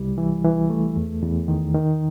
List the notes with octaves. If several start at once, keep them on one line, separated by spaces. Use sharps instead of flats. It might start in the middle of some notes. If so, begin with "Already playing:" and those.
Already playing: C2 G3
E3
E3
A3
E2
E2
D#3
D#3